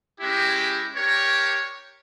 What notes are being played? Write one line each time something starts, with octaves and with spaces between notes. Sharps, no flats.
G#3 C#4 E4 G4
D4 G4 A#4 C#5